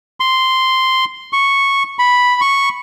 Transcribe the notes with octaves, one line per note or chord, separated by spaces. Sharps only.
C6
C#6
B5
C#6